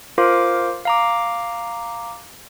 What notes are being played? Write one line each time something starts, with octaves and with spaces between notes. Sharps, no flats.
F4 A#4 C5 F5 D6
F5 A#5 D6